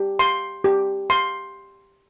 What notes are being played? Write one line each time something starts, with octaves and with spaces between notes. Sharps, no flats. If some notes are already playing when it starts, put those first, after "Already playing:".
Already playing: G4
C6
G4
C6